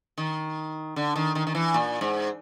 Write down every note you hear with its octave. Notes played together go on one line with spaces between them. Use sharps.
D#3
D3
D#3
D#3
D#3
E3
A#2
G#2